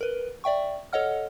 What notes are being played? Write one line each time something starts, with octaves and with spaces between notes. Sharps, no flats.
A#4 B4
D5 E5 G5 C#6
A4 C#5 D#5 F#5 F6